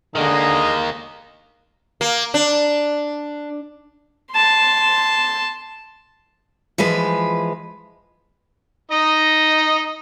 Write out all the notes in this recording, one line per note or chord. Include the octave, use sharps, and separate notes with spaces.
D3 D#3 G#3 A#3 D#5 A#5
A#3
D4
A5 C6
E3 F3 G#3 B4
D#4 D#5